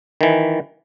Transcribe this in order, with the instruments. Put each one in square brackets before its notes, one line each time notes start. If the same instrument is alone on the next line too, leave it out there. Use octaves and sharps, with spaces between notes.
[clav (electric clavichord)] D#3 E3